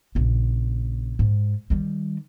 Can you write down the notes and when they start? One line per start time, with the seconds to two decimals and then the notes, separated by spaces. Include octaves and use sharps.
0.15 A#1 C#3
1.19 G#2
1.70 D#3 G3